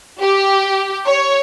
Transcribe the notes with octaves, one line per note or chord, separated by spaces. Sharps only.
G4
C#5